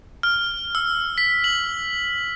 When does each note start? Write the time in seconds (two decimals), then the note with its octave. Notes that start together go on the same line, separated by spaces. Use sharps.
0.23 F6
0.75 E6
1.18 B6
1.44 F#7